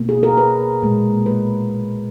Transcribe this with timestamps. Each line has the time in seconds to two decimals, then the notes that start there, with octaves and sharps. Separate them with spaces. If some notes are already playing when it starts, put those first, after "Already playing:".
Already playing: B2 A#3
0.09 G#4
0.23 A#4
0.37 B4
0.82 A#2 G#3
1.26 B4